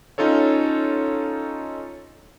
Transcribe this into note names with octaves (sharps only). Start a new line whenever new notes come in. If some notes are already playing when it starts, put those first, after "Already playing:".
C#4 D#4 F4 A4 C#5